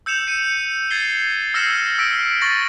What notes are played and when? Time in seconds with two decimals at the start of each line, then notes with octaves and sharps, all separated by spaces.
0.06 E6 G6 C#7 E7 F7
0.27 C#7 D#7
0.90 G#6 A6 C7 G7
1.54 E6 F6 A#6 C7 C#7 E7
1.99 E6 B6 D7
2.41 C#6 A6 A#6 F#7